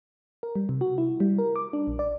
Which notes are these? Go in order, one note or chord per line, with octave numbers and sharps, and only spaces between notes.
A#4
G3
C3
F#4
E4
G3
A#4
D6
D4
A#1
D5